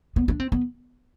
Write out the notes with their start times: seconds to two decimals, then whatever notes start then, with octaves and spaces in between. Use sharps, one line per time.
0.16 B3
0.28 D4
0.40 C4
0.52 B3